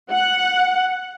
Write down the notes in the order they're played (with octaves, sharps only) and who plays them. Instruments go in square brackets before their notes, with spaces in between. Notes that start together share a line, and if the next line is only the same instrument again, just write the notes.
[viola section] F#5